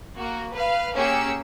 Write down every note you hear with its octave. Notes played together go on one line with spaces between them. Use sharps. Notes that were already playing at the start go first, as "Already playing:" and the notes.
A#3 F#4
B4 F5
A#3 C#4 G4 G#4 E6 C#7